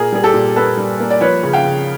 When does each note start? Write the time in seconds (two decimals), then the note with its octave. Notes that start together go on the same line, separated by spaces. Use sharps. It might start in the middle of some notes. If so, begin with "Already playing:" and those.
Already playing: A#2 G#4 A#4
0.12 G3 G#4
0.24 G4 A4
0.34 A#2
0.56 A#3 A4 B4
0.77 G3
1.00 A#3
1.10 D5
1.21 F3 B4 C#5
1.43 C#3
1.53 F5 G5
1.64 C#3